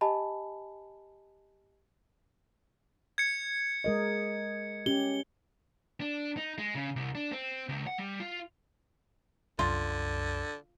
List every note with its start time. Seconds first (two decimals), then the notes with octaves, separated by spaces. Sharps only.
0.01 G4 D#5 G#5 A5 B5
3.18 G#6 C#7
3.84 G#3 A#4 D#5
4.86 C#4 G4 G7
6.00 D4
6.37 D#4
6.58 G#3
6.75 C#3
6.96 C2
7.15 D4
7.32 C4
7.69 C#2
7.87 F#5
7.98 G3
8.20 F4
9.59 C2 F#2 D3 F4